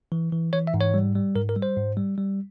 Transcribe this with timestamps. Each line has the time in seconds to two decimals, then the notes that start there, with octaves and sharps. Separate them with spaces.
0.12 E3
0.32 E3
0.53 E3 C#5
0.67 E5
0.74 G#2
0.81 C#5
0.94 G3
1.15 G3
1.35 G#2 A#4
1.49 A#4
1.56 G3
1.62 C5
1.77 G#2
1.97 G3
2.18 G3